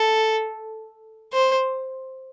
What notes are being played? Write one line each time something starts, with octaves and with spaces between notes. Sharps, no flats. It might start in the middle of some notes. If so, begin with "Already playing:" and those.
Already playing: A4
C5